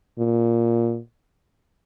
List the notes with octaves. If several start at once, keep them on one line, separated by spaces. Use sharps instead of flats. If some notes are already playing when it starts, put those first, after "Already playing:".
A#2